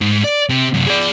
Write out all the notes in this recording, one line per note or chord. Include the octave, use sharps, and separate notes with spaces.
G#2
D5
C3
F#2 C3
G#4 D5